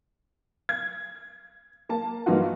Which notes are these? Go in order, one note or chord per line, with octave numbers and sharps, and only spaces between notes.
G#6
A#3 A5
G2 E3 A#3 D#4 F4 F#4